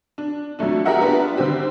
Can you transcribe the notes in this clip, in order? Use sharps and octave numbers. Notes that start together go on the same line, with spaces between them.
D4
F2 F#3 A3 D4
G4 G#4 A#4 D#5 E5 F#5
B3 D4 F4 B4
D3 D#3 C4 G4